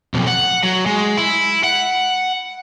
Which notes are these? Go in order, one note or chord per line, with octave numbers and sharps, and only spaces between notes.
B1 F2
F#5
F#3
G#3
E4
F#5